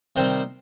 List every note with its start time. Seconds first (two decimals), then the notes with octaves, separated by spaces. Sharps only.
0.16 C3 D#3 G3 C4 C5